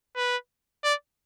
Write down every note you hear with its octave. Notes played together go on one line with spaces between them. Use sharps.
B4
D5